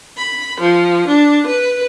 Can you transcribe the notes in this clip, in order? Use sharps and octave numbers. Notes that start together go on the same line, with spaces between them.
B5
F3
D4
B4